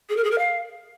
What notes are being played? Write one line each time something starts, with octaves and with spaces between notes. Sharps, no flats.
G#4
A#4
G#4
A#4
F5